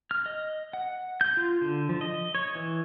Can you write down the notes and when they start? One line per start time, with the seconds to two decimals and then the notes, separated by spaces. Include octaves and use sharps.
0.11 F6
0.26 D#5
0.73 F#5
1.21 G6
1.37 F4
1.62 D3
1.89 F3
2.01 D#5
2.35 C#5
2.55 E3